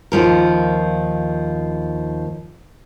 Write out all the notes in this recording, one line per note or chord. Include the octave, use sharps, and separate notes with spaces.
D#2 F3 A#4